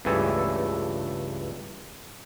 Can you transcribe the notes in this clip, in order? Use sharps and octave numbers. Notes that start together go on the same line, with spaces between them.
C#2 G2 E3 A3 G#4 A4